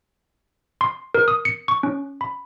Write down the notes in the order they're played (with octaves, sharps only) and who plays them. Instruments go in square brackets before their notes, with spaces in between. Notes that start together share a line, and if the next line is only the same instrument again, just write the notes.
[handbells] C6
A#4
D#6
C#7
C#6
C#4
B5